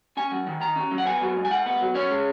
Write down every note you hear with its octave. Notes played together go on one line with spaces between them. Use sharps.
C#4 G#5
F#3
D#3
D#3 A#5
C#4
F#3
F#5
B3 G#5
F#3
G#2
G#5
G#2 F#5
B3
F#3
C#4 C#5
G#3